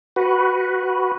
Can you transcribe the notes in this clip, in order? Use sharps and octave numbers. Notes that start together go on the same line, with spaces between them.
F#4 B4